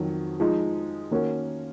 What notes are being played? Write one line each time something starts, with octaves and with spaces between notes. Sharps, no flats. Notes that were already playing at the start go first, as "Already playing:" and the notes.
Already playing: F2 D#3 F#3
F3 G#3 D#4
D#3 A#3 C#4 F#4 A#4